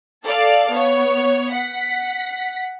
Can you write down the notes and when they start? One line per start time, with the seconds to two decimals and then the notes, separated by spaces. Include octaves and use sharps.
0.25 A4 D5 F5 A5
0.71 B3 C#5
1.53 F#5 B6